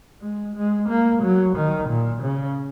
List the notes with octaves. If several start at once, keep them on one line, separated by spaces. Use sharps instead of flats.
G#3
G#3
A#3
F#3
D#3
A#2
C#3